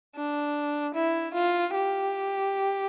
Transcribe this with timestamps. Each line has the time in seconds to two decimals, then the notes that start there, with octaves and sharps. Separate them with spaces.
0.15 D4
0.94 E4
1.34 F4
1.74 G4